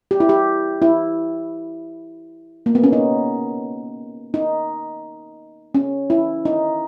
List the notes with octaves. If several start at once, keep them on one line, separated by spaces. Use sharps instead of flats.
G4
E4
G4
E4
A#3
B3
C#4
D#4
D#4
C#4
E4
D#4